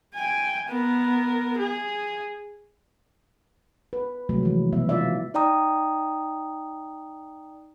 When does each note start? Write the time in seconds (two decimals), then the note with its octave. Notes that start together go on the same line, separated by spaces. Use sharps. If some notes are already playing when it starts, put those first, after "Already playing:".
0.15 G5 G#5
0.69 B3 A#4
1.58 G#4
3.93 B4
4.29 C3 F#3 G#3 A3
4.43 E3 F3
4.72 B2 B3 E5
4.89 E4 F4 D5 E5
5.34 D#4 D5 G5 A#5 D#6